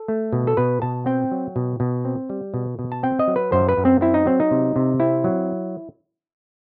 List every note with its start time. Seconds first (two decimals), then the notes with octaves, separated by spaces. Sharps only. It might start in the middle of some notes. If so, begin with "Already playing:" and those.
Already playing: A4
0.08 A3
0.33 B2
0.47 A4
0.57 B2 B4
0.82 B2 A5
1.06 C4 G5
1.31 F#3
1.56 B2
1.80 B2
2.05 C4
2.30 G3
2.54 B2
2.79 B2
2.92 A5
3.03 C4 G5
3.19 D#5
3.28 F#3
3.36 B4
3.52 F#2 C5
3.69 B4
3.77 F#2
3.85 C4
4.01 C4 E4
4.14 D#4
4.26 F#3 C4
4.40 D#4
4.51 C3
4.76 C3
5.00 C4 E4
5.24 F#3